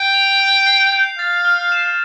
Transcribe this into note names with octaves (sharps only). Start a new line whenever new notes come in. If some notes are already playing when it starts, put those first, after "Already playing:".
Already playing: G5 G6
F7
G6
C7
G6
F5 A6
F6
E7